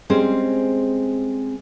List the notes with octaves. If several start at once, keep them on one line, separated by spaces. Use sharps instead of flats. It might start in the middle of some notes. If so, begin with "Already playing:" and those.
G3 G#3 C4 C#4 G#4 C5